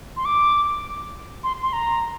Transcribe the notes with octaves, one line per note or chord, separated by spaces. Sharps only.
C6
D6
C6
C6
A#5